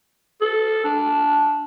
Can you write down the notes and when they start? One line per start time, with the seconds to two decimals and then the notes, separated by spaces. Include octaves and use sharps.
0.41 A4
0.84 D4